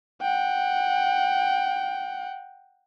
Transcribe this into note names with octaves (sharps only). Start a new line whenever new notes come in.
F#5 G5